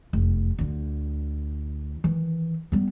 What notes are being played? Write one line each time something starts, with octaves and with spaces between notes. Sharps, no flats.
F1 E2
D2 D3
D#3 E3
G3 B3